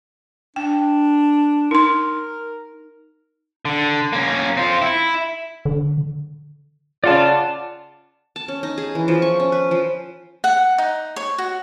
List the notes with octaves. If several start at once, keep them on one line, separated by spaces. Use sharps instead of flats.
D4 G5
D#4 A#4 C6
D3
A#3 C#4
C4 F4
E4
D3
C#3 F4 D5 F#5 A5
A5
C#4
D#4
G#4
E3
F3
C#6
C#4
B4
F3
F#5
D#4
C#5
F#4